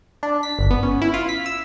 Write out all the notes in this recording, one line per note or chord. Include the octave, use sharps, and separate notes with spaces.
D4
B6
G1
B3
C#4
E4
F4
B6
E6